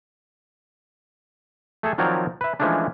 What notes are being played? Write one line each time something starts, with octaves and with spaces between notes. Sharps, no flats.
A3 G#4 A4 G#5
D#3 F3 F#3 C4 C#5 D5
B4 E5
E3 F3 G#3 A3 C#4 D4